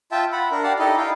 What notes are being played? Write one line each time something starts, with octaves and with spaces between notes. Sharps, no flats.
F4 E5 G5 A5
F#5 B5
D4 A#4
G4 D5 F5 F#5 A5
D#4 E4 G4 A4 D#5
D#4 E4 F5 G5